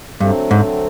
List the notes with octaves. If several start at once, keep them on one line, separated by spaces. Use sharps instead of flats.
G2 D3 F#3 A3 C4
G#2